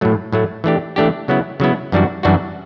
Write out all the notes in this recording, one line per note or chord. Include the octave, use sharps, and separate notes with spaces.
A2 F#3 A3
A2 F#3 A3
E3 A3 D4 G4
E3 A3 D4 G4
C#3 F#3 B3 E4
C#3 F#3 B3 E4
F#2 E3 G3 D4 F#4
F#2 E3 G3 D4 F#4